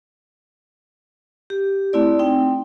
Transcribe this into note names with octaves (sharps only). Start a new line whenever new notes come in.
G4
A3 C4 E4 D5
C4 D#4 G5